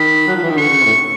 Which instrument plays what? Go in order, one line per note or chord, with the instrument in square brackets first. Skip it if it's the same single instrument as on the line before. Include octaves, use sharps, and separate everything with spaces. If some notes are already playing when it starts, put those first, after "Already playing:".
Already playing: [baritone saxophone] D#3 [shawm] B5
[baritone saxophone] F#3
F3
E3
D#3
[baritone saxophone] D3 [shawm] C#6
[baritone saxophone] C#3
C3
A2